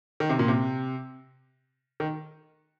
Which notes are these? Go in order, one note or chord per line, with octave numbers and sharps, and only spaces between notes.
D#3
C3
A#2
C3
D#3